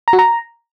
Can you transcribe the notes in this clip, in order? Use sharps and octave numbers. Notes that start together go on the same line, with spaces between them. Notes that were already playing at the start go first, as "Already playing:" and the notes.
A#5
F#4
A#5